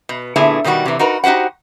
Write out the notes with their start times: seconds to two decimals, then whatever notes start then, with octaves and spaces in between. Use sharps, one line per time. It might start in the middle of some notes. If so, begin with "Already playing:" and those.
0.09 B2
0.36 A#2 D3 A3 B3 E4 G#4
0.64 B2 D#3 G3 D#4 F#4
0.86 C3 E3
0.99 D#4 F#4 A#4 B4
1.24 D#4 F#4 G4 C5 F#5